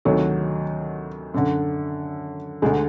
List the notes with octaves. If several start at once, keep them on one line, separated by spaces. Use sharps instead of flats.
D2 C3 D#3 F#3
F#2 D3
D2 D3 G#3